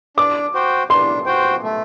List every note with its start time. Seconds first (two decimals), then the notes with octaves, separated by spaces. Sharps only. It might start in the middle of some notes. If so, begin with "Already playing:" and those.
0.17 D4 D6
0.54 F#4 C5 G5
0.90 D4 C6
1.26 F#4 C5 G5
1.63 A3